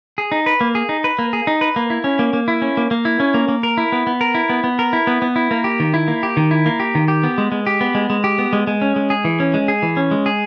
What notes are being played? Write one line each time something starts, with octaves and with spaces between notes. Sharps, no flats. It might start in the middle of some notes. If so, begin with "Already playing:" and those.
G#4
D#4
B4
A#3
G#4
D#4
B4
A#3
G#4
D#4
B4
A#3
E4
C#4
A#3
A#3
E4
C#4
A#3
A#3
E4
C#4
A#3
A#3
A#4
E4
B3
B3
A#4
E4
B3
B3
A#4
E4
B3
B3
E4
A#3
G4
D#3
E4
A#3
G4
D#3
E4
A#3
G4
D#3
G4
B3
G#3
G#3
G4
B3
G#3
G#3
G4
B3
G#3
G#3
C#4
G#3
G#4
E3
C#4
G#3
G#4
E3
C#4
G#3
G#4